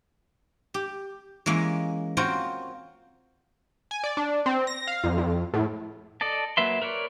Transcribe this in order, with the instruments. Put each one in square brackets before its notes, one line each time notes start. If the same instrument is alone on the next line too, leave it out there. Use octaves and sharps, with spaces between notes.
[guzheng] G4
E3 G#3 A#3 C#4
C4 F4 F#4 A#4 C5 C#5
[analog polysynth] G#5
D5
D4
C4
A#6
F5
F2
F2
A2
[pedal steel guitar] A4 D5 D#5 A5
F#3 A#3 B4 E5 C6
A#4 B4 C#5 D5